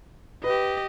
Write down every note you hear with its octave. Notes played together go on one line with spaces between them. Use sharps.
G4 B4 D#5